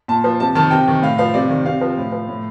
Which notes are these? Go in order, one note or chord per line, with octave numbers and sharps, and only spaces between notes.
A#2 A5
F3
C3 A5
D#3 A5
C3 G5
D#3
A2 F5
F3 F5
C3 D5
D#3
C3 F5
F3
A2
F3
A2